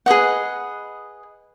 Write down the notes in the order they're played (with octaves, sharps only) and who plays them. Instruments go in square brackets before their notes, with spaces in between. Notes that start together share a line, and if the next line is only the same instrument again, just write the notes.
[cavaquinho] G#4 B4 D#5 F#5